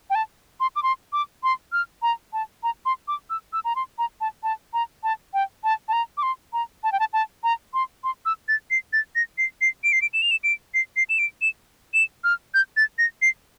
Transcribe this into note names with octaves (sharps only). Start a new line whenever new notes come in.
G5
A5
C6
D6
C6
D6
C6
F6
A#5
A5
A#5
C6
D6
E6
E6
A#5
C6
A#5
A5
A5
A#5
A5
G5
A5
A5
A#5
D6
C6
A#5
A5
G5
A5
A5
A#5
C6
C6
E6
A6
C7
A6
A#6
C7
C7
D7
C7
D7
E7
F7
E7
D7
C7
C7
E7
D7
E7
E7
F6
G6
A6
A#6
C7